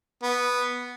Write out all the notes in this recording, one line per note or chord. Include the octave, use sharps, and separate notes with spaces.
B3